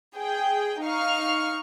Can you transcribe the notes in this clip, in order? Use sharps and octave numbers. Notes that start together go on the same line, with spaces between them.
G#4 G5
D#4 F5 C#6 F6